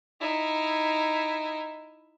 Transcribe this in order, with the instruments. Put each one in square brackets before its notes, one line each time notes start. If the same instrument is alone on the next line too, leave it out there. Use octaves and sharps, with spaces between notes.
[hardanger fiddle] D#4 E4